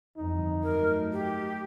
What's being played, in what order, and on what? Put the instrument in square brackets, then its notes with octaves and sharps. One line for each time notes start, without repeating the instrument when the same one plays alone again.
[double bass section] G1 F2 E3 [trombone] D#4
[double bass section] F#3 A3 [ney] A#4
[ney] G4